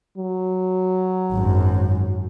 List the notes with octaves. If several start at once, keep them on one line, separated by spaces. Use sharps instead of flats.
F#3
G#1 F#2